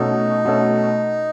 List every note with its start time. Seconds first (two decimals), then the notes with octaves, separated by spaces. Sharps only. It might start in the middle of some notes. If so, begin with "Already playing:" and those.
Already playing: B2 A3 C#4 D#4 F#4 A4
0.45 B2 A3 C#4 F#4 A4